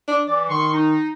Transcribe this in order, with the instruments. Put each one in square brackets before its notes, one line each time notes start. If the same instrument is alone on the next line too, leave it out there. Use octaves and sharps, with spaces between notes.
[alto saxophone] D4
[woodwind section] E3 [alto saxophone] D5
[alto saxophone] D#3 [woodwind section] C6 C#6
[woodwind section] D#4